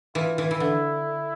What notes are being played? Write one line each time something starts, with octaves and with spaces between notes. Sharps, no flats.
E3 F4
E3
E3 E4
D3